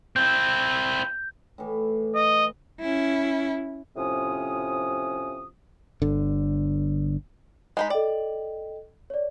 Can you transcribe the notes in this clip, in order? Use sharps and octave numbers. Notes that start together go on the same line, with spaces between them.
C4 E4 G6
A2 E3
D#5
C#4 E4
A2 C3 F3 C#4 D#6
G1 D3
G#3 D#4 B5
A4 D5 D#5 G5
C#5 D5